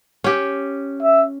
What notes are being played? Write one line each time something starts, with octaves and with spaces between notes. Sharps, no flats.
C#4 G4
E5